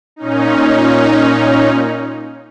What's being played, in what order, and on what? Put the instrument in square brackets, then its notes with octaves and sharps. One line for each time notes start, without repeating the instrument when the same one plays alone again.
[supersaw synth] A#2 C#4 D#4